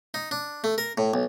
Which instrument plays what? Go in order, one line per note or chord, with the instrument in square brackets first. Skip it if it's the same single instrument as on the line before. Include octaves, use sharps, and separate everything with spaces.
[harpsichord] D#4
D4
A3
A#4
A2
B1